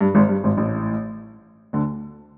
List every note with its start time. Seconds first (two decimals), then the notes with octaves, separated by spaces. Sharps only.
0.01 G2
0.15 G#1 G#2
0.29 G2
0.44 G#1 G#2
0.57 A1 A2
1.73 D2 D3